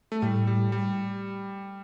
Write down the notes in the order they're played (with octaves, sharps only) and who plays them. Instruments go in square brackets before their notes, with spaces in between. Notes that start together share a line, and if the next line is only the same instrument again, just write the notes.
[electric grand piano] A3
[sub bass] A2 [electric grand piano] G3
[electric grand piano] G3
G3